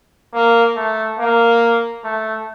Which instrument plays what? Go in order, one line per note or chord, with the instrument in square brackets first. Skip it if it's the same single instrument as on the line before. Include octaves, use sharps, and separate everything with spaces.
[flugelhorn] A#3
A3
A#3
A3